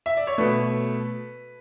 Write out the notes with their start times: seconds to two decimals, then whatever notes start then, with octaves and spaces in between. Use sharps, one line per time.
0.06 E5
0.17 D5
0.27 C#5
0.38 B2 A3 B4